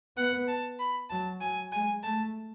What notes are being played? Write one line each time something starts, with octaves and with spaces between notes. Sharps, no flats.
B3 F#5
A5
B5
F#3 A5
F#3 G#5
G#3 G#5
A3 A5